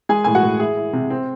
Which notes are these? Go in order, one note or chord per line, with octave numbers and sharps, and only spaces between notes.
G#3 G#4 G#5
A2 G#5
F#4 F#5
A2
E4 G#4
E4
C3
C4